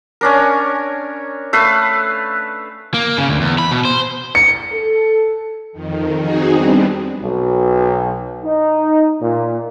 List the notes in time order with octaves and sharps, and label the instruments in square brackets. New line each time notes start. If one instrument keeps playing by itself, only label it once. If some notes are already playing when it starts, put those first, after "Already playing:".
[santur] C#4 D4 A#4
A3 B4 F5
[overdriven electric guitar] A#3
C#3
D2
E2
B5
B2
C5
[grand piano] C#7
[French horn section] A4
[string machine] F2 D#3
C4 D#4 F#4 G#4
G3 B3 C4 D4
[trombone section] B1
D#4
A#2